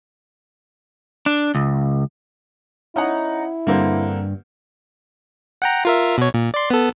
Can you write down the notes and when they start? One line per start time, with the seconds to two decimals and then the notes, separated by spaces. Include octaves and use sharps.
1.26 D4
1.55 C#2
2.96 C#4 D#4 E4 F#5
3.67 G2 D3 A#3 C4
5.62 F#5 G5 A#5
5.85 F4 A#4 E5
6.18 B2 C#5
6.34 A#2
6.54 D5 C6
6.70 B3 A4